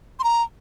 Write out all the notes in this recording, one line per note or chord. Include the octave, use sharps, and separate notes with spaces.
C6
A#5